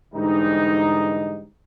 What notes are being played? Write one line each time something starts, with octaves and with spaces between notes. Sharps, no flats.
G#2 D3 E3 G3 D#4